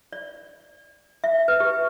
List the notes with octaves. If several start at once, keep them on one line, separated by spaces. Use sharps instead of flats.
D5
E5
B4
G4